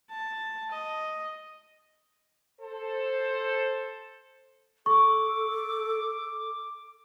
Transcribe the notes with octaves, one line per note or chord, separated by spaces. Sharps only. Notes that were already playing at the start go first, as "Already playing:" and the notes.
A5
D#5
A4 C5
A4 C#6 D6